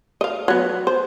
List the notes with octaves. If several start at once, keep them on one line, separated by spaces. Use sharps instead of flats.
D#5 F5
F#3 B3
C5